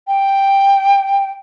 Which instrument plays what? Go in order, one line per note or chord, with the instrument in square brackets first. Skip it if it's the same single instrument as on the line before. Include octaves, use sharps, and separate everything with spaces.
[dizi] G5